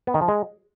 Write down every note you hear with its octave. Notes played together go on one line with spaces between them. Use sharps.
B3
D#3
F3
G#3